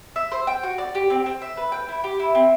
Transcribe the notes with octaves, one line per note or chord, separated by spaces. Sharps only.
E5
C5
G5
F#4
D5
G4
C4
C4
E5
B4
G5
E4
G4
E4
C4